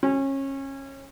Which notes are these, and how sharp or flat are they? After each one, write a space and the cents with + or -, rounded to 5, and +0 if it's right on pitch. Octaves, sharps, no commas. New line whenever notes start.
C#4 -25